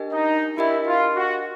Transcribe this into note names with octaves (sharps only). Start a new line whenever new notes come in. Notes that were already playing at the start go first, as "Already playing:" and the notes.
Already playing: D4 G4 A#4 D#5 G5
D#4
D4 E4 G4 A#4 D#5 G5
F4
F#4